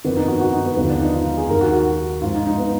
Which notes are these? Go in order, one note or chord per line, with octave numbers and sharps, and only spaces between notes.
F2 D#3 B3
D#4
F#4
F#4
D#4
B3
D#2 D3 F3 B3
D4
D#4
F4
G#4
D#2 D#3 A#4
F#4
F#4
G#2 F3 F4
D#4
D#4
B3